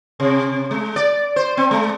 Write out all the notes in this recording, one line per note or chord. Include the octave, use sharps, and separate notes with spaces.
C3
G#3
D5
C5
C4
G#3